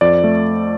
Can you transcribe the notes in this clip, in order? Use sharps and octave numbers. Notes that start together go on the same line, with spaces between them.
F2 D5
A3